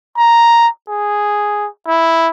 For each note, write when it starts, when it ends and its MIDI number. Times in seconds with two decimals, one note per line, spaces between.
0.17 0.68 82
0.89 1.67 68
1.87 2.29 64